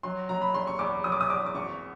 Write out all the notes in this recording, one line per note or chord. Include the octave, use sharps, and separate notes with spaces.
F#3 C6
F#3 A#5
B5
E2 C6
C#6
E2 D6
F#3 D#6
D6
D#6
E2 D6
D6
G#1 C#6